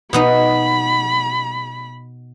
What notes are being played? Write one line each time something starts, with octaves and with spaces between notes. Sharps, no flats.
B2 B3 D#4 B5